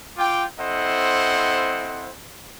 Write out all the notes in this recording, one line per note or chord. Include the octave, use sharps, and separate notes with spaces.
F4 G5 D6
C4 E4 A4 C5 D#5 F#5